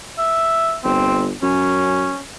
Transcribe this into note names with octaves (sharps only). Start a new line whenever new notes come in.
E5
G1 C4
F#2 C#4